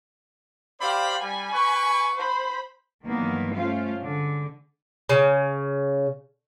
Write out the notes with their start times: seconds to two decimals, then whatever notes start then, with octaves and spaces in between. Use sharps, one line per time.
0.80 G4 C5 D5 F5 B5
1.23 G3 G#5 B5
1.53 B4 C#6
2.16 C5 B5
3.05 G2 D#3 E3 F#3 A#3 B3
3.54 A3 C#4 F4 C5 F5
4.00 D3 G#3
5.09 C#3